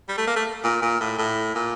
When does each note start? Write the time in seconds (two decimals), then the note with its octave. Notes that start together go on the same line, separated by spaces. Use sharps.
0.09 G3
0.17 A3
0.27 A#3
0.36 A3
0.64 A#2
0.82 A#2
1.00 A2
1.18 A2
1.55 A#2